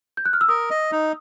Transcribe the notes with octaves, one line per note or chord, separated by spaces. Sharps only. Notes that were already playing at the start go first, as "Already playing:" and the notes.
G6
F#6
F6
E6
A#4 D#6
D#5
D#4